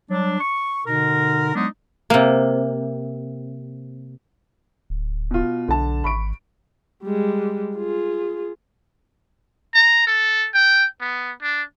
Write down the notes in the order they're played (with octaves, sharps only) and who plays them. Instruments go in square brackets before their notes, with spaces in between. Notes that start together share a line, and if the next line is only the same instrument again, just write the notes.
[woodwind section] F#3 G3 D4
C#6
B2 D3 D#4 A#4
F#3 G#3 B3 D4 D#4
[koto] C3 A#3
[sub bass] D1
[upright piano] B2 F4
[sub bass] B1 [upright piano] D3 A5
[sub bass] G#1 [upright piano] B5 C#6 D7
[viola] G3 G#3
F4 G#4
[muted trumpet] A#5
A4
G5
B3
D4